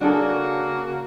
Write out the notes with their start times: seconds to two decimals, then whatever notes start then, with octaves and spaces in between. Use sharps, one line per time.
0.01 C#3 A#3 D4 F#4 G#4 A4